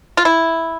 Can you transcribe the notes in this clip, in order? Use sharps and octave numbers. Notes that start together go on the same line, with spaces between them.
F4
E4